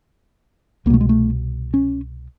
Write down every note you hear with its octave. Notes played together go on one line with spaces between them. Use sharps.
C2 B2 A3 A#3
G#3
A3
C#4